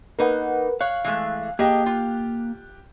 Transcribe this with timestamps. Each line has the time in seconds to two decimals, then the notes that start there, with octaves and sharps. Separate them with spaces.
0.19 A#3 D#4 A#4 B4 F#5
0.81 C#5 F5 F#6
1.05 E3 G#3 A3
1.59 A#3 G4 G#4 D#5 G5 A5
1.86 F4